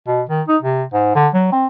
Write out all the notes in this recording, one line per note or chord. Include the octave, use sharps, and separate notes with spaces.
B2
D#3
D#4
C3
G#2
D3
F#3
C4